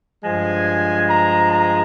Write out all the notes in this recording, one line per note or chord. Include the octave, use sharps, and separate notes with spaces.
G2 F3 G#3 G#5
A#5
A#5